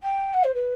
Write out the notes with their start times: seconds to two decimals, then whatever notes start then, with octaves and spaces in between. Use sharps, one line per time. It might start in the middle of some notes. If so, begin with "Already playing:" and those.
0.02 G5
0.33 F#5
0.43 C5
0.54 B4